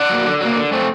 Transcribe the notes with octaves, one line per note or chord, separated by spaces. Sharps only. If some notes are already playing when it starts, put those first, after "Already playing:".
Already playing: D5 F#5
F#3 A#3
D3
F#3 A#3
D3
A3 C4